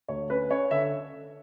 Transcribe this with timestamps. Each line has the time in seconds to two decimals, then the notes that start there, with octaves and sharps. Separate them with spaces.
0.09 D2 C#5
0.29 C#4 B4
0.49 C#4 C#5
0.71 D3 E5